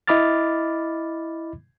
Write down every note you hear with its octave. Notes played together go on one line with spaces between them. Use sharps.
E4 D#5 B5 D6 F6 A6